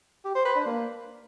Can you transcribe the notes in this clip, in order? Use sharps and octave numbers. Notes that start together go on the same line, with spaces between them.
G4
C5
B4
D4
A#3